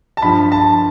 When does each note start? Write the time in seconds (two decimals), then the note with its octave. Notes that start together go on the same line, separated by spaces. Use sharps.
0.17 A5
0.22 G2 F3 B5
0.52 A5